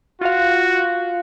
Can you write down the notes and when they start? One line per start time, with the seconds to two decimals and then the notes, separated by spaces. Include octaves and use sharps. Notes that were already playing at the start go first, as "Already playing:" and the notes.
0.21 F4 F#4 F5